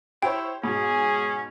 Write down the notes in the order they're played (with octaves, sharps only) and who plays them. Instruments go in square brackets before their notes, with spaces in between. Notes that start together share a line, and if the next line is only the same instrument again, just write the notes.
[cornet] E4 [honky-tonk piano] G4 C5 C#5 [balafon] G5
[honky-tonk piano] G#2 B2 [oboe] C#4 [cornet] G#4